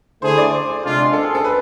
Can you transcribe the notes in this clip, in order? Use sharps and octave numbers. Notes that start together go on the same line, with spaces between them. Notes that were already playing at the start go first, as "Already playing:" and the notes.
D3 A3 E4 G#4 C5
D5
C5
C3 G#3 D4 F4
A4
G#4
A4
B4